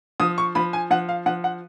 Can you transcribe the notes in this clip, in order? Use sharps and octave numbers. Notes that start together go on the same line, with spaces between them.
F3 D#6
C#6
F3 B5
G#5
F3 F#5
F5
F3 F#5
F#5